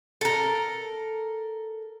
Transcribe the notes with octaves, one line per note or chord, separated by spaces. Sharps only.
A4 A#4